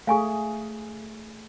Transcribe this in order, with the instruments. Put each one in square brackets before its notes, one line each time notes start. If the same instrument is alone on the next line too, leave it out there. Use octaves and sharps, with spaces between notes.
[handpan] A3 G#4 [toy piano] F5 G#5 C#6